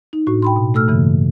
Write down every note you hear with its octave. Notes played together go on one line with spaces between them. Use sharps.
D#4
A2 D4 F#4
G5 B5 C6
B2
A3 A4 E6 F6
G2 C#3 E3 A#3